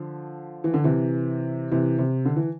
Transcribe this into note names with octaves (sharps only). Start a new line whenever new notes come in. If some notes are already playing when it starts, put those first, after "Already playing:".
Already playing: D3 F3
E3
D3
C3 E3
C3 E3
C3
D3
E3